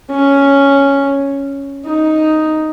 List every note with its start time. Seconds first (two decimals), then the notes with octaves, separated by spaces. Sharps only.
0.11 C#4
1.86 D#4